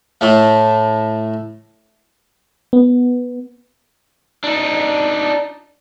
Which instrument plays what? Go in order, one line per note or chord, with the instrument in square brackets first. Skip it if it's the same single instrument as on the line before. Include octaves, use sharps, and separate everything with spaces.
[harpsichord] A2 A3
[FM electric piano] B3
[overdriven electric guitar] D4 D#4